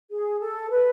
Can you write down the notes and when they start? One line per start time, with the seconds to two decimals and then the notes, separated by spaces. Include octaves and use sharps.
0.10 G#4
0.40 A4
0.71 B4